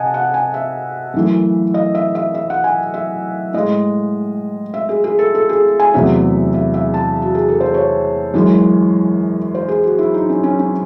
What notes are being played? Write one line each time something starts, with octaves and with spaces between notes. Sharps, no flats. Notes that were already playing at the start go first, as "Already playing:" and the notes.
Already playing: C3 D#5 F#5 G#5 A5
F#5
G#5
E5
F#2 E3 A3
D#5
E5
E5
E5
F#5
G#5
E5
A2 G#3 D#5
E5
G#4
G#4
A4
A4
G#4
G#5
E2 C3 F#3 A3 E5
E5
E5
A5
F#4
G#4
A4
C5
C#5
F#2 E3 G#3
C5
G#4
F#4
E4
D#4
C#4
C#4
C#4